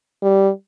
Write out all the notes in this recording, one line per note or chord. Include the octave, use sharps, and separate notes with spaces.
G3